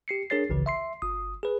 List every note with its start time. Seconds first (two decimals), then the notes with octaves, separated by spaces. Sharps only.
0.08 G4 C7 C#7
0.30 D4 G#4 A#4 C#5 A6 C7
0.50 G#1 C#2 C#3 E3
0.66 E5 C6 C7
1.02 G1 D#6
1.43 G#4 B4